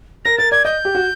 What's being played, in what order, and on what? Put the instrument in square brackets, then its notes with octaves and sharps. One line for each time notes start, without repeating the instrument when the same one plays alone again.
[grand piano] A#4 [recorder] A#6
[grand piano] A#4 [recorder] A6
[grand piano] D5 [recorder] G#6
[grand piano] D#5 [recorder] G6
[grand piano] G4
F#4